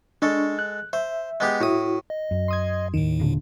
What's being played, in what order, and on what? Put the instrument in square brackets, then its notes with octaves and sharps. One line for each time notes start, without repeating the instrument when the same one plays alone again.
[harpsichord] G#3 A4 [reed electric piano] D4 C#6
[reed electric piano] F#6
[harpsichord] C5 [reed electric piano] E5
[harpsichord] G#3 B3 G4
[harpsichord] A2 D#6 [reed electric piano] E4 F#4
[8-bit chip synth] D#5
[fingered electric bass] F#2
[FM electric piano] C6 D#6 G#6
[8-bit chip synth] D#2 A2 [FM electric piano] D#3
[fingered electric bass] D#1 A#2 D3